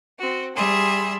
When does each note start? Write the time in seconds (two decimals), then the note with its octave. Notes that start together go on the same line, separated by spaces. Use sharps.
0.19 C4 F#4
0.55 G3 G#4 E5 C6